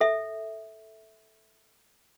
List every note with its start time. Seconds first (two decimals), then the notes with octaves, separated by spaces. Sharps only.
0.01 A4 E5